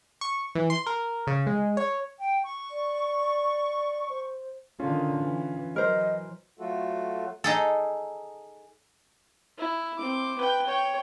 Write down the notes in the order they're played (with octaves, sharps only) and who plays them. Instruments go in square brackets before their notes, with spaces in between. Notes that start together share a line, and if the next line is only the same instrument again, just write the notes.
[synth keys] C#6
E3
C6
A#4
C#3
G#3
C#5
[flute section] G5
C#6
[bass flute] D5
C5
[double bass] D3 D#3 [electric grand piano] C#4 F4
[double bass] E3
[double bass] E3 F#3 [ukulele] A#4 C5 [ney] D#5
[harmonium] F#3 A3 F4 F#4 A4
[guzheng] D#4 G#4 A4
[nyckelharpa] E4
C4 D6
B4 G5
C#5 G5